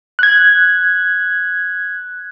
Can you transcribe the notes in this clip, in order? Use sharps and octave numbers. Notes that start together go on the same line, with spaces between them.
F#6 G#6